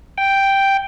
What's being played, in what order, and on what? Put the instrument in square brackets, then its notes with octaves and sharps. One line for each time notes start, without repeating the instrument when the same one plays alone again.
[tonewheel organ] G5